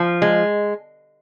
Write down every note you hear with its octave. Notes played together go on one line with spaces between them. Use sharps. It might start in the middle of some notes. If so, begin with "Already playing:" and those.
Already playing: F3
G#3